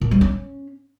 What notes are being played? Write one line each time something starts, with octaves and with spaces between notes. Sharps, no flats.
A#2
G3
C#4